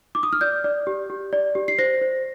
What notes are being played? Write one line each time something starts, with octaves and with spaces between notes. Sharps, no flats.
D6
D#6
F6
D5 G6
D5
G4
G4
D5
G4
C7
C5 A#6
C5